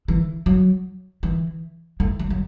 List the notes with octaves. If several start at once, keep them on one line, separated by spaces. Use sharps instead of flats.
E3
F#3
E3
A3
F#3
F#3